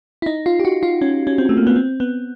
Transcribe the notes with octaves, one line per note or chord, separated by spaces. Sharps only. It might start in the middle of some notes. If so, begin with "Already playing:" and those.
E4
D#4
F4
G4
F#4
F4
C#4
C#4
C4
A3
A#3
B3
C4
B3